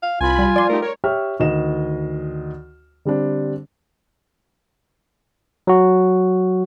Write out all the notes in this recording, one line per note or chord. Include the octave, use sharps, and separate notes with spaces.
F5
C2 F4 G#5 B5
G3
F3 D5 C6
A3 D#4 G4 A#4
A#4 C#5
G4 C#5 E5 G5 C#6 F6
D2 D#3 D#5 E7
D3 G3 C4 D4
F#3 F#4